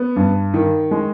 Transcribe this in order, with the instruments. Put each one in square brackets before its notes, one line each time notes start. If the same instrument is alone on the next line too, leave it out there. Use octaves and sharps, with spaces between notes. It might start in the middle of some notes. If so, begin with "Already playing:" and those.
Already playing: [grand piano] B3
G2
D#3
G#3